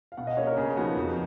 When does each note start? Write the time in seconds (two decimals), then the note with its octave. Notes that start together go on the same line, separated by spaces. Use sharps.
0.12 F5
0.17 B2 F#5
0.27 D#5
0.37 A#3 C#4 C#5
0.47 A#4
0.57 C#3 G#4
0.76 F3 B3 D#4 F#4
0.96 F2